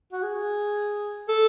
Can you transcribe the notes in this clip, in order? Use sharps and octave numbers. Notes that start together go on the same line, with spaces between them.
F#4
G#4
A4